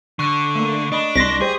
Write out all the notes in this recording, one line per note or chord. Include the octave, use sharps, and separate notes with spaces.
D3 C#6 F#6
A3 A#3
D4 D#5 B5
C2 C6 A#6 B6
G4 G#4 C5 D5